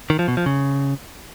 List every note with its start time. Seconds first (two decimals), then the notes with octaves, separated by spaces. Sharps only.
0.10 D#3
0.19 F3
0.28 B2
0.37 F3
0.46 C#3